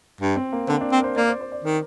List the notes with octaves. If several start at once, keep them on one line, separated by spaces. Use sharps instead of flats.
G2
C4
A#3
D3 C4
D4
C4
A#4
C5
A#3 D5
C5
C5
D5
D#3 A#4